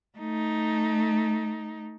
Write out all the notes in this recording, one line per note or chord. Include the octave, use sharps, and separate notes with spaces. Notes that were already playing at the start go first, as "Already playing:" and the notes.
A3 D#4